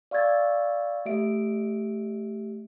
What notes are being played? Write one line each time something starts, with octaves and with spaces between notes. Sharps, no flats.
D5 F5 C#6 E6 G#6 A6
A3 G4 E5 D7